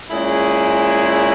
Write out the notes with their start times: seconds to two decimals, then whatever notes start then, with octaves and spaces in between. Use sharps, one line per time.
0.10 A#2 G#3 C#4 E4 G#4